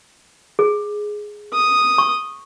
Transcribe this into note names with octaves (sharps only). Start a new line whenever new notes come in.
G#4
D#6
C#6